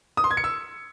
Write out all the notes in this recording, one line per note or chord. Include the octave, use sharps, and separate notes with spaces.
D#6
C6
G#6
C#7
E6